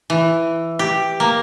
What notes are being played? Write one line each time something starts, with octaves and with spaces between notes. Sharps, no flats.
E3
G4
A#3